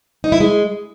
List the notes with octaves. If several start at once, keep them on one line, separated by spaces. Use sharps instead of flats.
D#4
E4
G#3